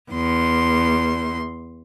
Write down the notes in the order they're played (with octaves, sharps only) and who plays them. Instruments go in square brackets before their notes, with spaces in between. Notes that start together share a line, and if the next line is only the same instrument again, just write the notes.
[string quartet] E2 C6